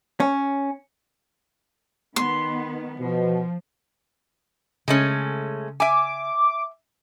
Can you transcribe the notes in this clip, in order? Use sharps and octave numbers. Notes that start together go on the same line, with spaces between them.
C#4
D#3 B3 C6
B2 F3
C#3 G#3 A3 C#4
E5 G#5 D6